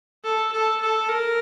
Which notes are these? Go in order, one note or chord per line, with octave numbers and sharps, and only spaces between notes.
A4
A4
A4
A#4